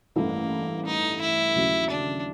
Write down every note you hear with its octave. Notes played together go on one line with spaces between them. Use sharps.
A1 G2 E3 A3 A#3
D#4
E4
D#2 C#3 F#3 A3 C#4
D4